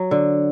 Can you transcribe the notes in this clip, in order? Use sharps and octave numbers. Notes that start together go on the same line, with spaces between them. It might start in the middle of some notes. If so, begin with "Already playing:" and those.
Already playing: F#3
D3